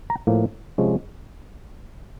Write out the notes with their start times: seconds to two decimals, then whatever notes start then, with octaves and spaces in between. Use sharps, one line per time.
0.10 A#5
0.27 A2 F3 A#3
0.78 C3 F3 G#3 C#4